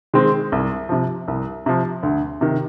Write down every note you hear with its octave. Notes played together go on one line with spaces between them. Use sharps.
D#3 G#3 C4
C2
C3 F3
C2
C3 F3
D2
C3 D#3